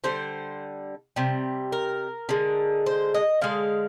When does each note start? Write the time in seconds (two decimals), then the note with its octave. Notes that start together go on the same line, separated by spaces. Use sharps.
0.04 D3 G3 C5
1.16 C3 G3
1.72 A#4
2.29 D3 G#3
2.86 C5
3.14 D#5
3.41 D3 G#3 F5